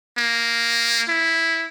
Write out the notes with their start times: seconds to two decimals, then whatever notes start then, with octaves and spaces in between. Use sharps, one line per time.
0.18 A#3
1.08 E4